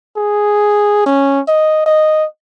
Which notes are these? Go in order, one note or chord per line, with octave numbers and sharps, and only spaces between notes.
G#4
C#4
D#5
D#5